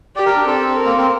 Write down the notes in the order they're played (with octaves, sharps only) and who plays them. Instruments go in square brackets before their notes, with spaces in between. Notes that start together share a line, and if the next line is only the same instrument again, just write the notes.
[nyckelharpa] G4 [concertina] D5
[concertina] A#4
D4
[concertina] C4 [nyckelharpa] A4
[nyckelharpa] A#4
[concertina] A#3
C4